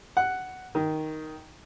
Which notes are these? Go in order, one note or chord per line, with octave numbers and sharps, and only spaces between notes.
F#5
D#3